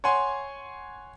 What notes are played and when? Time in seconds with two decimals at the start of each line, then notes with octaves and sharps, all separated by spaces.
0.04 C#5 F#5 G#5 C6